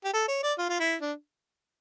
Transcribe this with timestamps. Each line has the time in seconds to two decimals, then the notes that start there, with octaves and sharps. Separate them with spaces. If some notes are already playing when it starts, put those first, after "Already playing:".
0.04 G4
0.13 A4
0.28 C#5
0.43 D5
0.58 F4
0.69 F4
0.80 E4
1.01 D4